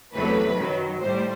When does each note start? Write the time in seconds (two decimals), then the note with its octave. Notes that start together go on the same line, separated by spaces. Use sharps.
0.14 E2 C3 F#3 A3 B4
0.58 F#2 D#3 F#3
1.02 A2 G3 C5